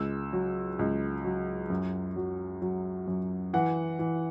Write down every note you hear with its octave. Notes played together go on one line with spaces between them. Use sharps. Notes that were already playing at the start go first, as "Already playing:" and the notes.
Already playing: C#2 E6
F#3
C#2
F#3
F#2
F#3
F#3
F#2
E3 F#5
E3